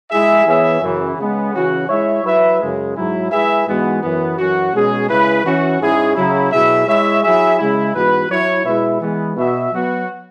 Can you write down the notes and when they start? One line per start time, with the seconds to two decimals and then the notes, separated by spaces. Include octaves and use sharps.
0.11 G#3 E4 G#4 E5
0.46 E3 B3 G#4 C#5 E5
0.82 F#2 C#3 E3
1.17 C#3 G#3 B3
1.53 C#3 E3 C#4 F#4
1.88 G#3 E4 C#5 E5
2.24 F#3 E4 B4 E5
2.59 F#2 C#3 G#3
2.95 G#2 F#3 E4
3.31 G#3 E4 G#4 B4 E5
3.66 G#2 E3 G#3 B3 F#4
4.02 F#2 E3 B3
4.38 F#2 E3 C#4 F#4
4.73 B2 G#3 C#4 G#4
5.09 C#3 G#3 E4 B4
5.44 E3 C#4 F#4
5.80 G#2 G#3 C#4 E4 G#4
6.15 C#3 F#3 E4
6.51 B2 F#3 E4 G#4 E5
6.87 G#3 E4 C#5 E5
7.22 F#3 E4 G#4 E5
7.58 C#3 G#3 E4
7.94 G#2 E3 B3 F#4 B4
8.29 F#3 E4 C#5
8.65 B2 G#3 E4 B4 E5
9.00 E3 G#3 B3
9.36 B2 B3 F#4 E5
9.71 F#3 B3 F#4